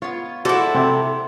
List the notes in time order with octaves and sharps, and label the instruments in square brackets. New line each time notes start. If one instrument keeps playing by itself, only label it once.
[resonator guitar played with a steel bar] B3 F4 [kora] C#5
[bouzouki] E4 A4 [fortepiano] F#4 [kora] C5 [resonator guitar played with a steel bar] D5 F#5
[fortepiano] C3 [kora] C4